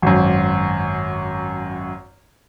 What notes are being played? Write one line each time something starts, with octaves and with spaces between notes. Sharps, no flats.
G#1 F#2